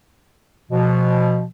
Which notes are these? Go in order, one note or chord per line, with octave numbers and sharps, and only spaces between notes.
B2 F3